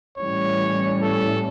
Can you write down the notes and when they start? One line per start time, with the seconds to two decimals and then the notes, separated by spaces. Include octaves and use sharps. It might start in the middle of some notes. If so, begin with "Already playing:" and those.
0.18 A2 E3 G3 C#4 C#5
1.02 A4